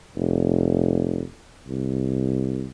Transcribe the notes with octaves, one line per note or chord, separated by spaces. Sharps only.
F1
C2